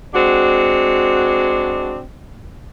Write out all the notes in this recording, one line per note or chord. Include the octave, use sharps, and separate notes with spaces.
G#3 C4 D4 F#4